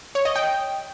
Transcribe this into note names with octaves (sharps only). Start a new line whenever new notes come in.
C#5
D#5
G5